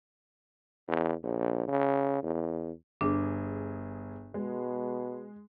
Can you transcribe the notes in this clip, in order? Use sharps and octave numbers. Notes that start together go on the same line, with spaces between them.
E2
A#1
C#3
E2
G1 D4 G#4
B2 G#3